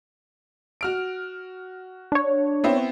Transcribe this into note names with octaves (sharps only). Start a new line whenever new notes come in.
F#4 F6 D7
D4 C#5
B3 C4 E4